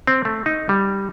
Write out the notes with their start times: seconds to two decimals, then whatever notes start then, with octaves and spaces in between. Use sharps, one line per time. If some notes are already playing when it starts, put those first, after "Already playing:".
0.07 C4
0.25 A3
0.46 D#4
0.69 G3